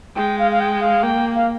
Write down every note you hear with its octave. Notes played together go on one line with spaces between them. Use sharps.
G#3 G5
F5
F5
G5
F5
A#3 G5
F5